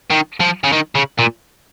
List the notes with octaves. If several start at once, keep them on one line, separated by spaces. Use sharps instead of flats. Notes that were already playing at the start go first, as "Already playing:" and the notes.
D#3
F3
C#3
D#3
C#3
A#2